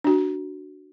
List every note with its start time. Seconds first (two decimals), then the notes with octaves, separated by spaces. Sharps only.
0.04 D4 F#4